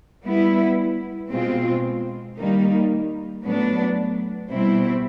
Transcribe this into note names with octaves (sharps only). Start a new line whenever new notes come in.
G3 B3 E4
B2 G#3 C4 F4
D#3 G3 A#3 D#4
A2 F#3 B3 D4
B2 G3 C4 E4